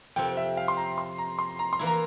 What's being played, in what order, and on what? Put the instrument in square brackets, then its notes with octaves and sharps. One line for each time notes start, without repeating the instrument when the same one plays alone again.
[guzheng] F2 C3 F3 C4 [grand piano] G5
[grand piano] E5
F5
C6
A#5
C6
A#5
C6
A#5
C6
[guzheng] E3 A#3 E4
[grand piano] A#5